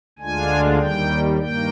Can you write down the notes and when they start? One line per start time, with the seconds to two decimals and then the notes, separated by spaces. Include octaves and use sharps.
0.19 D2 D3 G#3 D4 F4 G#5
0.78 D#2 D#3 G3 G5
1.39 G2 D#3 A#3 G5